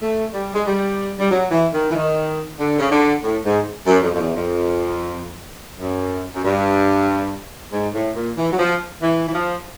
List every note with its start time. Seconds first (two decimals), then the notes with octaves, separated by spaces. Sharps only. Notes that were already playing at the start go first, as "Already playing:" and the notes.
0.02 A3
0.33 G3
0.54 G#3
0.66 G3
1.18 G3
1.30 F#3
1.51 E3
1.73 D#3
1.90 E3
1.95 D#3
2.59 D3
2.79 C#3
2.90 D3
3.22 A2
3.44 G#2
3.86 F#2
4.03 F2
4.13 F2
4.19 E2
4.35 F2
5.79 F#2
6.34 F#2
6.44 G2
7.72 G#2
7.94 A2
8.16 A#2
8.37 E3
8.51 F#3
8.58 F3
9.01 E3
9.28 E3
9.33 F3